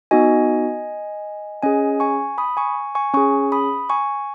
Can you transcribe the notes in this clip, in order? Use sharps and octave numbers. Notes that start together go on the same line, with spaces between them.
B3 D#4 F#4 D#5 G#5
C#4 G#4 D#5 G#5
G#5 C#6
B5 D#6
G#5 C#6
G#5 C#6
C#4 G#4 G#5 C#6
B5 D#6
G#5 C#6